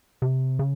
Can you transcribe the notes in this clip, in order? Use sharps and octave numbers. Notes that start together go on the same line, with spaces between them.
C3
C#3